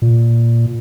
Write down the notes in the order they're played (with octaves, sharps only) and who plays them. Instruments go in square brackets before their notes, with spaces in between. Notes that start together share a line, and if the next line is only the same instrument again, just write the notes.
[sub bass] A#2